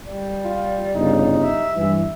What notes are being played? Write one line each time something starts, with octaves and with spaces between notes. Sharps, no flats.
G3
F4
G1 C#3 D#4
E5
G2 E3